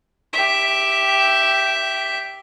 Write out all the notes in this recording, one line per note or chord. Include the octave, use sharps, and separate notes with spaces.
G4 E5